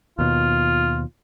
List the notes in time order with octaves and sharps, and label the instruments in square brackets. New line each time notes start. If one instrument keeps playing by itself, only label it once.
[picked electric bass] D#2 B2 [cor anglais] F4